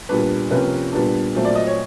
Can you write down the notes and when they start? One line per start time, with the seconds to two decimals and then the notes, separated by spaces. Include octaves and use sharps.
0.09 A#2 G3 B3 D4 B4
0.51 C3 F3 A#3 C#4 B4
0.92 A#2 G3 B3 D4
1.35 A#2 F#3 A3 C4
1.45 D5
1.55 D#5
1.67 C#5